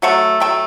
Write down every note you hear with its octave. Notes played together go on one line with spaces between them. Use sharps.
F#3 A3 F#5
F#3 A3 G5